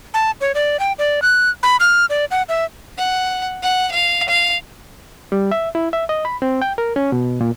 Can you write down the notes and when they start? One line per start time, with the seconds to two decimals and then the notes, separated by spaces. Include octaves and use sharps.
0.14 A5
0.41 C#5
0.55 D5
0.80 G5
0.99 D5
1.22 F#6
1.63 B5
1.80 F6
2.10 D5
2.31 F#5
2.49 E5
2.98 F#5
3.63 F#5
3.91 F5
4.29 F5
5.32 G3
5.51 E5
5.75 E4
5.93 E5
6.09 D#5
6.25 B5
6.42 C4
6.62 G5
6.78 A#4
6.96 C#4
7.12 B2
7.41 A#2